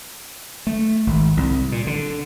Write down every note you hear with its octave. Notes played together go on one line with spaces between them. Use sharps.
A3
G#1
C2
A#2
D3